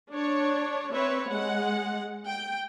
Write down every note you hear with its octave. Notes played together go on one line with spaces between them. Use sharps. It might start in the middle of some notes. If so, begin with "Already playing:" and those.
D4 C#5
C4 B4 C#5 E5
G#3 F#5
G5